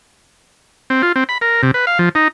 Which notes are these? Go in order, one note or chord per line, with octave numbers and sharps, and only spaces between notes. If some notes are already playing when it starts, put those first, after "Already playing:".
C4
F4
C4
B5
A#4
C3
B4
F5
F3
D#4